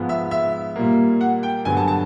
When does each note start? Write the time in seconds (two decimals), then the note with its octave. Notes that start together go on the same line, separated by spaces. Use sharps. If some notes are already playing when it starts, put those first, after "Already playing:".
Already playing: G#2 F3 G#3 B3
0.09 E5
0.31 E5
0.76 A#2 G3 A#3
1.21 F#5
1.43 G5
1.65 G2 D3 F#3 B3 G#5
1.77 A5
1.88 A5